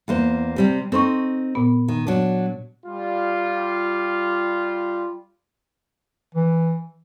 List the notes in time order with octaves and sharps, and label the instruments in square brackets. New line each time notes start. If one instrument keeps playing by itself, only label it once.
[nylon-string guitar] E2 A#3 C5
C3 G3 C4
[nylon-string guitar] C4 D#4 [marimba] A4 C6 C#6
[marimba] A#2 B3
[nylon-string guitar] D#3
F#3 D4
[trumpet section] G3 F4
[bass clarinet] E3